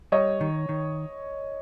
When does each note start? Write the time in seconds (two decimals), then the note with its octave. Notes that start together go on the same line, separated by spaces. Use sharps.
0.12 G3 C#5 D#5
0.41 D#3
0.69 D#3